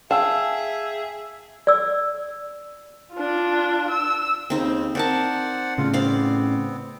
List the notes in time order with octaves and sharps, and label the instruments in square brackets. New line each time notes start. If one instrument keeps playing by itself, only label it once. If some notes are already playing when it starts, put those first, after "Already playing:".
[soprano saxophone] G#4 [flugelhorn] E5 [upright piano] F5 G5 E6 [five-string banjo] A5
[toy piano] D5 E6
[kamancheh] D4 F4
E6
[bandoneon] D#2 C#3 [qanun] C4 D#4 C5
[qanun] C4 A#4 A5 [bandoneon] C5 D5 F#5
[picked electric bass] A2 C#3 [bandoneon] F4
[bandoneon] B3 C4 [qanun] C5 D5 F5